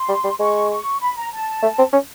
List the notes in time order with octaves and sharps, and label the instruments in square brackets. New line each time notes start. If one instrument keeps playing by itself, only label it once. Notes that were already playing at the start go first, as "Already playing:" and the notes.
Already playing: [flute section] C6
[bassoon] G3
G3
[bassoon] G#3 [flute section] C#6
[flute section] C#6
B5
A#5
A5
[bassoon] A3
C4
C#4